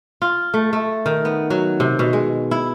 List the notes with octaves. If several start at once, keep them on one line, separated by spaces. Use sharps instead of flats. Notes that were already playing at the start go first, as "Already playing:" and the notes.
F4
A3
A3
D#3
B3
F#3
C3
B2
G#3
E4